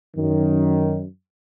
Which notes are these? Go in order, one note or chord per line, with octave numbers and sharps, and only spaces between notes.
F#2 D#3